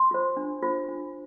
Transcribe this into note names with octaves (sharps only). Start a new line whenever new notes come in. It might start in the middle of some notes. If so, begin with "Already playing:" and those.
Already playing: C6
F4 C5
D4
F4 C5
D4